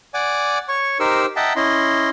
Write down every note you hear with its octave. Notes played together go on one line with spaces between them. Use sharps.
D5 F#5 G#5 D6
C#5 C#6
D#4 G4 A#4 C5 E6
D#5 E5 F#5 G5 A5 A#5
C#4 E4 D#5 C6